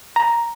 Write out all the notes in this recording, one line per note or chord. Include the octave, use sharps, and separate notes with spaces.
A#5